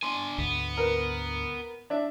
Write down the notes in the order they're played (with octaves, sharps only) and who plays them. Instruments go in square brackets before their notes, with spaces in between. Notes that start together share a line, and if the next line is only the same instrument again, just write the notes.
[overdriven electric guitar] D4 G#5 [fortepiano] C6
[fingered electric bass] D2 G#2 D3 [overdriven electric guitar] B3
[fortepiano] A#4 B4
D4 E5